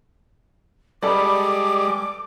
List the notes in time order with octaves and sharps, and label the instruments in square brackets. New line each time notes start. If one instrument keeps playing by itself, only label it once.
[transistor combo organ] G3 G#3 [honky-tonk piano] A4 D5 [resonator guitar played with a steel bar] B4 [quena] D6